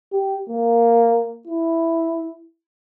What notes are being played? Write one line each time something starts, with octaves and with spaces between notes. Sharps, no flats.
G4
A#3
E4